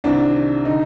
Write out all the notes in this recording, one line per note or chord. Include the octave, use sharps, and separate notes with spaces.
C2 C3 D#3 D4
D3 D#4